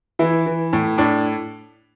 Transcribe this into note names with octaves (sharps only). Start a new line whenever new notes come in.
E3 E4
E3
A2
A2 D4